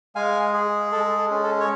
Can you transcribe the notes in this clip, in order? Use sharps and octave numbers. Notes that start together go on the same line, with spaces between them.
G#3 F5 G#5
G#4
G#3 A4
A4
C#4
A4
C#5